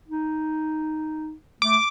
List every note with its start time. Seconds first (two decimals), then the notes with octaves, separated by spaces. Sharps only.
0.08 D#4
1.62 A3 D6